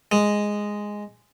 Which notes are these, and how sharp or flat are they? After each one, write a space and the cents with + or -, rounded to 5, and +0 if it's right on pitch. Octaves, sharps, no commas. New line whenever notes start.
G#3 -5